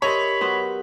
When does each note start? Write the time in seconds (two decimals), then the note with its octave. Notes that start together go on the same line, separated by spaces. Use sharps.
0.02 G4 A#4 C5 C#5 D#5 E5 B5
0.41 F#3 B3 C5